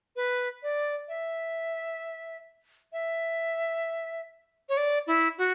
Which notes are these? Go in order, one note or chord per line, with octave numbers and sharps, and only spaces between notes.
B4
D5
E5
E5
C#5
D5
E4
F#4